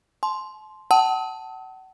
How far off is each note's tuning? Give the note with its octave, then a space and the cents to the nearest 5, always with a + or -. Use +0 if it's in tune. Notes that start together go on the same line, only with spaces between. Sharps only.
A5 -40 C6 +0
F#5 +35 A5 +0 D#6 +45